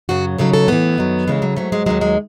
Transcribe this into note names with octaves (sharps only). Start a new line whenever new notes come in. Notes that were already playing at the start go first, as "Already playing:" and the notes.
F#2 C#3 F#3 F#4
D#2 C#3 F#3 A4
A4
A2 E3 B3
F#2 D#3 F#3
F#2 C#3 E3 G#3
F#3
G#2 F#3 A3
G#3
D#2 D#3 F#3 G#3
G#3